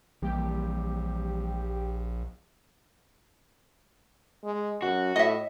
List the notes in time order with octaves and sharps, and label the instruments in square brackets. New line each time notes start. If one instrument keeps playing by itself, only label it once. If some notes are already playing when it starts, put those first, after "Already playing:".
[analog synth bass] A#1 [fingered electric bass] E3 G3 A#3 [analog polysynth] G4
[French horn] G#3
[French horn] F#2 [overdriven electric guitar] F#4
[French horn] A2 [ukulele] D#5 E5